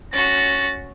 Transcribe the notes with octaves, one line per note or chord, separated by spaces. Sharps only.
C#4 F#4 A6 A#6